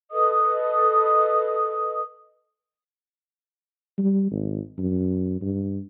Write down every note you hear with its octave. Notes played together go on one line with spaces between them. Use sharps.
A4 B4 D#5 D#6
G3
G#1
F#2
G2